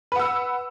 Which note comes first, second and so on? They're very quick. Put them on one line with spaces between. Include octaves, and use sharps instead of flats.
B4 F#5 E6